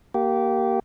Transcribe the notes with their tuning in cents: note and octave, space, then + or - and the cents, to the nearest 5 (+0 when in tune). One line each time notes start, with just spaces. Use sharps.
A#3 +0 G4 -20